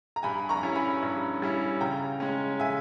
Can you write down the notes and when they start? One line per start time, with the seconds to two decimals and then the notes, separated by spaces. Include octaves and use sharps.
0.16 A#5
0.23 G2 G#5 B5
0.49 A#5 C#6
0.63 G3 C#4 E4
0.75 G#5 B5
1.03 G2
1.42 G3 C#4 E4
1.81 C#3 G5 A#5
2.20 G#3 C#4
2.60 C#3 E5 G#5